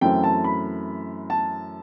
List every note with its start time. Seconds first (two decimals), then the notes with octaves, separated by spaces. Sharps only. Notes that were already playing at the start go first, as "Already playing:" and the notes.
0.01 F#2 E3 A3 C4 G5
0.24 A5
0.44 B5
1.30 A5